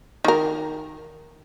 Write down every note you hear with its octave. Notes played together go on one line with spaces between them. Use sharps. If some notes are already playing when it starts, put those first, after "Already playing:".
D#3 A#4